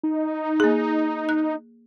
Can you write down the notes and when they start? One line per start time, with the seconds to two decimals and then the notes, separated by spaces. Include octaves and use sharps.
0.03 D#4
0.60 A#3 G#4
1.29 F#6